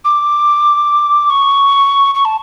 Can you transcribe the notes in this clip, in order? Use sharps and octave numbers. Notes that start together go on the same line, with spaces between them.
D6
C#6
C#6
A5